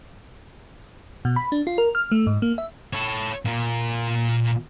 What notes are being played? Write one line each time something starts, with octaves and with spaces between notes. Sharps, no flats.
B2
B5
D4
F4
A#4
F6
A3
G#2
A#3
E5
A4 C#5
A#2 A#3